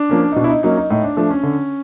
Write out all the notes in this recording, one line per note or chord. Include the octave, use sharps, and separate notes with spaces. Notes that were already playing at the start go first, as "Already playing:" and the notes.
Already playing: D4
F3 A#3 C#4
D#4
B2 D4
E4
D#4
F#3 A#3 C#4 D#4
D#4
A2 D#4
D4
F3 A3 D4
C#4
D3